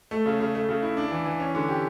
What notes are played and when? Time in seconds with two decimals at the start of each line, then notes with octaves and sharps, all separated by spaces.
0.11 A3
0.26 C#3
0.40 C#3
0.55 A3
0.69 C#3
0.83 E4
0.97 D4
1.11 E3
1.25 E3
1.40 C#4
1.55 D3
1.68 G4